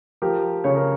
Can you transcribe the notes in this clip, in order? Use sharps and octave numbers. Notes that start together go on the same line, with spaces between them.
F3 G4 A#4
C#3 C#5
A#4